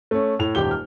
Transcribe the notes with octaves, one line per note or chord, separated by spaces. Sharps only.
A3 C#4
A2 F7
D#1 G#1 G4 G7
F6